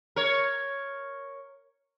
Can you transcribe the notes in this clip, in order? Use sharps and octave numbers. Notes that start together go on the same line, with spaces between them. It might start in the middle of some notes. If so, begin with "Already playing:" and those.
A#4 C#5